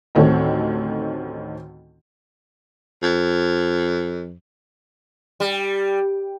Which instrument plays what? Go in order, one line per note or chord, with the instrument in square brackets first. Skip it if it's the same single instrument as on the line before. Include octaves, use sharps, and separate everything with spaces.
[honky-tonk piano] A1 D2 D#3 C4 A4 C#5
[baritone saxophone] F2
[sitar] G3